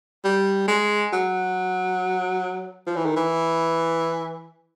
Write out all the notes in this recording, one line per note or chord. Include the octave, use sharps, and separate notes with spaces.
G3
G#3
F#3
F3
E3
D#3
E3